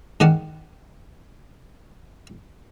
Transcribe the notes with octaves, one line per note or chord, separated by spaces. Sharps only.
G#2 D#3 C#4 D5 F#5 A5